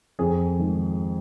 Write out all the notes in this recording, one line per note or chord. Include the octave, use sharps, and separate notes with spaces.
F2 G#4
D#3 G#3